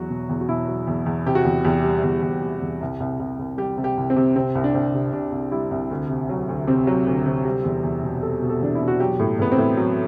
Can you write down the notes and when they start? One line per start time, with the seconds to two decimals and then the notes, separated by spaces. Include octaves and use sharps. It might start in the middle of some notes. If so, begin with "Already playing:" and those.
Already playing: E2 F#3 F#4
0.10 B2
0.29 E2
0.41 F#4
0.49 B2 E4
0.68 F#3
0.87 E2
1.06 E2
1.26 C3 G4
1.35 F#4
1.45 E2 G4
1.65 E2 G4
1.84 G3
2.03 E2
2.22 E2
2.42 G3
2.61 E2
2.81 C2
3.00 C2
3.20 C2
3.39 C2
3.58 G3 G4
3.78 C3
3.84 G4
3.97 C2
4.10 C4
4.16 C3
4.36 C3 C4
4.55 C2
4.64 D4
4.74 C2 C4
4.94 C3
5.13 C3 D4
5.32 C2
5.52 G3 E4
5.71 C2
5.91 D2
6.10 C3
6.29 F#3
6.49 D2
6.67 C3 C4
6.87 F#3
7.07 D2
7.26 C3
7.45 G3
7.64 E2
7.84 E2
8.03 B2
8.22 G3 A4
8.42 B2
8.50 A4
8.61 E2 D4
8.75 E4
8.81 B2
8.88 F#4
9.00 F#3 G4
9.19 A2
9.39 A2 B3
9.52 C4
9.58 A2
9.77 F#3